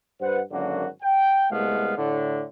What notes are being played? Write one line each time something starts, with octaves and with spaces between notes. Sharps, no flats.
G2 B4 C5 F#5
G#1 F#2 D3 A#3 F#4
G5
C2 G#3 A3 B3 F5
A2 D3